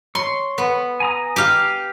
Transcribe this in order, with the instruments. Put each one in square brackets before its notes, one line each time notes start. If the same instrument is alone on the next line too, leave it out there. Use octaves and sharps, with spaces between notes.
[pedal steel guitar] C#5 [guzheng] C6
[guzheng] B3
[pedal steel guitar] G#5 A#5 D#6
[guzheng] G4 F5